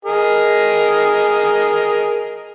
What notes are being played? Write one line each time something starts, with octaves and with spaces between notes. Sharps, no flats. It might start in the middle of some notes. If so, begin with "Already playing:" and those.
G#4 A#4 D#5